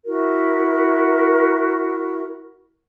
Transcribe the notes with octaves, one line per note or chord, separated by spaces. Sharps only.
E4 F#4 A#4